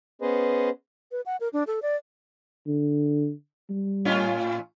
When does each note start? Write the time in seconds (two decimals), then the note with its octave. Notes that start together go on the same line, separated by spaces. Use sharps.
0.22 B3 C#4 G#4 B4 C5 D#5
1.12 B4
1.26 F#5
1.41 A#4
1.53 D4
1.67 A4
1.82 D5
2.67 D3
3.70 G3
4.05 A2 C#4 F4